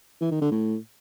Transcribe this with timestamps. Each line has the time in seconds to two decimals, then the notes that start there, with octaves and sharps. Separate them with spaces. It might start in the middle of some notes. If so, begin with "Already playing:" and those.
0.21 E3
0.31 D#3
0.41 D3
0.51 A2